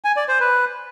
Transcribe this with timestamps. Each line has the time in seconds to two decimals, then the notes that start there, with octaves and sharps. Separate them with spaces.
0.04 G#5
0.16 D5
0.28 C5
0.40 B4